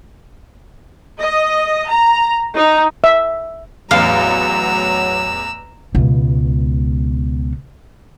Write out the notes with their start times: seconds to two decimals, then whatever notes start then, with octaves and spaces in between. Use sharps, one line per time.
1.19 D#5
1.88 A#5
2.55 D#4
3.04 E5
3.91 A1 E2 F#3 F5 A#5 E6
5.95 C#2 B2